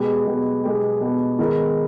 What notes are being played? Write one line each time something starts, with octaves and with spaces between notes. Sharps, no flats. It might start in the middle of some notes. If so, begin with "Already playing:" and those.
Already playing: B2 G#3 B3 G4
B2 G#3 B3 G4
B2 G#3 B3 G4
B2 G#3 B3 G4
D#3 G#3 B3 D#4 A#4